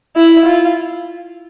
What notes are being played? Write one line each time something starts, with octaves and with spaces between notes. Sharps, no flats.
E4
F4